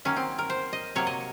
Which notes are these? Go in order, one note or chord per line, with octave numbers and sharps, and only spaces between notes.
D#3 F#3 A#3 C#4
C4
A#4
C5
D#5
C3 F#3 A#3 C#5
D#5